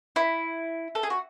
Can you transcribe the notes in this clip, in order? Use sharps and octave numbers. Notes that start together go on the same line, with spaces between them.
E4
A4
G#4
F#4